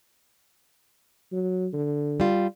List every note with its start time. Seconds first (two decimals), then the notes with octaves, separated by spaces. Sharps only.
1.32 F#3
1.73 D3
2.20 G3 F4